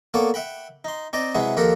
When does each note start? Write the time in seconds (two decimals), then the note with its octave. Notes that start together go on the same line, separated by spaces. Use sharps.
0.14 A#3 B3 A4 C#5 D5 A5
0.34 E5 F#5 G5 B5
0.85 D#4 C6
1.13 C4 D#4 D5 D#5
1.35 C3 F#3 G#3 E4 G#4 B4
1.57 D#2 F3 G4 A4 A#4 F#5